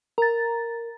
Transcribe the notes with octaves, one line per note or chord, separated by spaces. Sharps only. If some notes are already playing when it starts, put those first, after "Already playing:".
A#4 A#5 A6